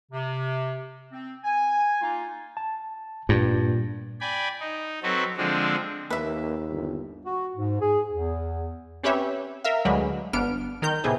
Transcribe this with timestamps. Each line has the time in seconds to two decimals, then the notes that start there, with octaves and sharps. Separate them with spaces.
0.12 C3
1.12 C4
1.44 G#5
2.01 A#3 D#4 F4
2.57 A5
3.29 G2 A#2
4.21 D5 G5 G#5 B5
4.60 D#4
5.03 F#3 C4 F#4 A4 B4
5.37 D3 F3 G#3 C4 D4
6.10 D#2 A#3 B4 E5
6.70 G1
7.24 F#4
7.56 G#2
7.80 G#4
8.08 E2
9.03 C4 C#4 G4 B4 C#5 E5
9.64 A#4 E5 F5
9.85 D2 D3 F#3 G#3 B4
10.33 G1 B3 D4 F6 D7
10.82 D#3 A#4 G6
11.04 A2 C3 B3 G#4 A4